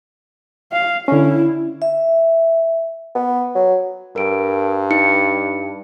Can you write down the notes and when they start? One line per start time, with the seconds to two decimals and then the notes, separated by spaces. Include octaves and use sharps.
0.72 F5
1.08 D3 C#4 E4
1.82 E5
3.15 B3
3.55 F#3
4.16 G2 A#4 D7
4.90 D#4 C#7